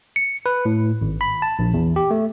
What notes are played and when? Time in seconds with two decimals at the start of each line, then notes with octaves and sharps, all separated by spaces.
0.16 C#7
0.46 B4
0.65 A2
1.01 G#1
1.21 B5
1.42 A5
1.59 A#1
1.74 E2
1.96 G4
2.11 A3